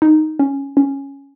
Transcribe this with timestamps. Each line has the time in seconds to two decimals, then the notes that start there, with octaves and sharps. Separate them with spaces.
0.02 D#4
0.39 C#4
0.77 C#4